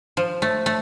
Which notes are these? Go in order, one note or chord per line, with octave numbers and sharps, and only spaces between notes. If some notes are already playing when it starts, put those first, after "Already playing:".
F3
A3
A3